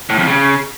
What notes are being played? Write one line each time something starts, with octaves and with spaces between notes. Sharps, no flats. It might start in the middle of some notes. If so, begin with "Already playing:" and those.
A2
F2
C#3